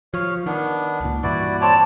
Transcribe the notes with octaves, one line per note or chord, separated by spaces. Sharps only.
F3 C#5 F5
D#3 B3 D4
C#2 A#2
G2 A#2 E3 E4 F#4 D5
C4 C#5 D5 A5